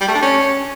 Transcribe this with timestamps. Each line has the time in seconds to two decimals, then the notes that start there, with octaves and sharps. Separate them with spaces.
0.01 G3
0.08 A3
0.15 D4
0.22 C#4